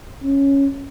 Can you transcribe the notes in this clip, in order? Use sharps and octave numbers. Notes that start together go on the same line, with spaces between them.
C#4